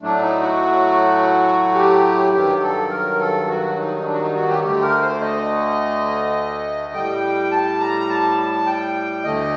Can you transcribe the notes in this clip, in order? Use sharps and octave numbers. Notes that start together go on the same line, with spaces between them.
A2 F#3 A3 D4
D#4
F#4
G4
G2 D#3 F#3 G4
A4
A#4
A4
F#4
D#4
D4
F#4
D#4
F#4
G4
D2 D3 A3 G4
A#4
C5
D#5
A2 G3 G5
A5
A#5
A5
G5
D2 D3 A3 D#5